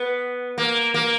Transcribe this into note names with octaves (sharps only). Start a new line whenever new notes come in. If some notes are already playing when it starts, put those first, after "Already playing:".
Already playing: B3
A#3
A#3